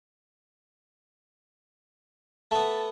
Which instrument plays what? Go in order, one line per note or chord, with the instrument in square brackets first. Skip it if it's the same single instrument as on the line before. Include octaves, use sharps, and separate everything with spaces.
[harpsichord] A3 B3 [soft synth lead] A5